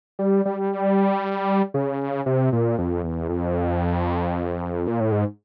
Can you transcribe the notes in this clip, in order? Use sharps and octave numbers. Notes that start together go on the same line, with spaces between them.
G3
G3
C#3
C3
A#2
F2
E2
F2
A#2
A2
G#2